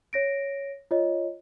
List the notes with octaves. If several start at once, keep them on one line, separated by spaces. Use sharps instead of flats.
C#5 A#6 D7
F4 C#5 D#5